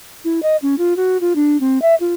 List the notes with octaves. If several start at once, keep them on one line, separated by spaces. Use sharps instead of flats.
E4
D#5
C#4
F4
F#4
F4
D4
C4
E5
F4